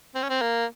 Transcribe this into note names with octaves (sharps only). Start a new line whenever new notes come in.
C4
C#4
C4
A#3